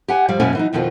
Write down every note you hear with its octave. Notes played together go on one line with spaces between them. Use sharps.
G4 F#5 G#5
G2 F3 G3 F5
F#2 B2 A#3 C#4 E4 G#5
E3 F#3 D#4
F2 B2 D#3 F3 C4 F4